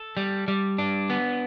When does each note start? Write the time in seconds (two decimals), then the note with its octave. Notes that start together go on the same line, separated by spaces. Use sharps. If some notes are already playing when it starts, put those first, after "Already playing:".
Already playing: A4
0.17 G3
0.48 G3
0.78 D4
1.10 B3